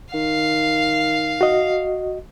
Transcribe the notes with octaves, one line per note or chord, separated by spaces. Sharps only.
D#3 F5
F#4 D#5